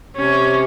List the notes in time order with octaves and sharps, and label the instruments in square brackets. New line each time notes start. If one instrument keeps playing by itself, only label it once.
[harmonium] C3 [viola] C#4